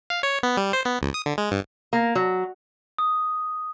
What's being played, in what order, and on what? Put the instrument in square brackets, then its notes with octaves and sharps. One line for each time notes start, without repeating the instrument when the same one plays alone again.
[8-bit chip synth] F5
C#5
B3
G3
C5
B3
C#2
D#6
D3
G#3
G2
[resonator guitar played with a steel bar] A#3
F#3
[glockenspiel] D#6